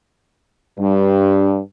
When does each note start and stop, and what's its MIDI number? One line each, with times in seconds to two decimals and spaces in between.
0.78 1.58 43